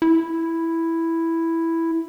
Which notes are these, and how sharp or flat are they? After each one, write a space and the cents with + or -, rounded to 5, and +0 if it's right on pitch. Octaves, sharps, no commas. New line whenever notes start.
E4 +0